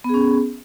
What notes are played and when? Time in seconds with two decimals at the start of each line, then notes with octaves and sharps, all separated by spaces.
0.04 B3
0.09 G#4
0.14 C#4